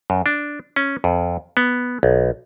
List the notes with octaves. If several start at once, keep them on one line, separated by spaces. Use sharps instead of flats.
F#2
D4
C#4
F2
B3
B1